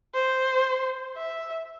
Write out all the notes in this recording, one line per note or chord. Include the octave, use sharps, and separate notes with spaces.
C5
E5